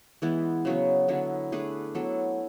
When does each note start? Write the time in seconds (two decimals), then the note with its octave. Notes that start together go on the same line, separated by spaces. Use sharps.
0.22 E3 G#3 B3 E4
0.65 C#3 F#3 B3
1.08 D3 F#3 B3 E4
1.52 A3 D4 G#4 B4
1.95 F#3 B3 E4 A4